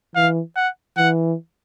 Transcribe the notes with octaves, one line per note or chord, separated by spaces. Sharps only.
E3 F5
F#5
E3 F#5